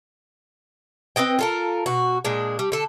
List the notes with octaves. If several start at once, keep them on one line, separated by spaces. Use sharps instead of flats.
C4 B4 D#5 G5
F4 A4 A#4
B2 F#4
A#2 G#3 D4
G3
D3 A4